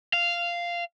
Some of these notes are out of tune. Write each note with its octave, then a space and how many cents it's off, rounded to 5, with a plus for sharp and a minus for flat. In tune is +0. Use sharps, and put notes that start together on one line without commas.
F5 -10